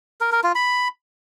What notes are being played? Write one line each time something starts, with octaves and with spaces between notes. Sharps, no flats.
A#4
A#4
F4
B5